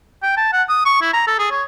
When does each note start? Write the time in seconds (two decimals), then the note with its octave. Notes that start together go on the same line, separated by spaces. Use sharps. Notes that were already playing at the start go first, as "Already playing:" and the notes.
0.23 G5
0.37 A5
0.53 F#5
0.69 D#6
0.86 C#6
1.02 E4
1.14 A#5
1.27 A4
1.39 G#4
1.52 C#5